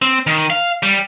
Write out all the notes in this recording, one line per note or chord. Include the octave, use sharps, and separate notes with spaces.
C4
D#3
F5
G3